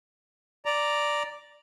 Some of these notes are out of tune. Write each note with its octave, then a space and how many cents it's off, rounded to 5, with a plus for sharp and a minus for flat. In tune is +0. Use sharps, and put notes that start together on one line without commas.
D5 +0 A#5 +0